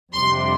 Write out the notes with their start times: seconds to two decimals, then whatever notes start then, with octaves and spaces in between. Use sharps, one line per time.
0.13 F2 C3 G3 D4 C6